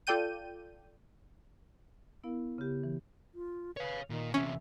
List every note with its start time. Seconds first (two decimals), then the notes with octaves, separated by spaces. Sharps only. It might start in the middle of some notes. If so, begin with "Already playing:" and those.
0.07 F4 A4 D5 G5 G6 D#7
2.24 B3 E4 A#4 F5
2.58 C#3 B3 G4
2.83 E3
3.35 F4
3.77 B4 C#5 F5
4.10 A#2 D#3
4.34 E2 C3 C#4 E5